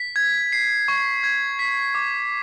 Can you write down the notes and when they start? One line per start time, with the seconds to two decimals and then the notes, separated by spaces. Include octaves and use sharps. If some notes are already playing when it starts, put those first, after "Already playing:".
Already playing: B6
0.16 G#6
0.52 C7
0.88 C#6
1.23 G#6
1.59 B6
1.95 D6